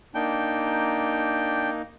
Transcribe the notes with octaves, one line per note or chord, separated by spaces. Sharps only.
A#3 D4 D#4 G5 G6